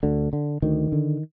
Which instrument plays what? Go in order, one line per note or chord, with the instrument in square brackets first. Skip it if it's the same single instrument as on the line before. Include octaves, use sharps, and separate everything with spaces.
[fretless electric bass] D2 D3
D3
D2 D#3
D3